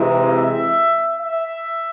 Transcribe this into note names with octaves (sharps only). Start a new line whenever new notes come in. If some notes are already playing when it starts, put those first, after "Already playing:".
Already playing: C3 E3 G#3 C4 D#4
E5
E5